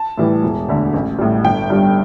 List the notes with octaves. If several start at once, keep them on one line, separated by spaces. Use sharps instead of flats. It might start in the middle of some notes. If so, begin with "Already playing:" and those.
Already playing: A5
A2 E3 G3
E1
D2 D3
A1
A2 G3
G1 G5
G2 G3